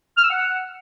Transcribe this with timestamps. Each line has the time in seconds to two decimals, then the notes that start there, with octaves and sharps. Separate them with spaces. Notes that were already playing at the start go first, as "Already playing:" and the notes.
0.17 F6
0.23 E6
0.30 F#5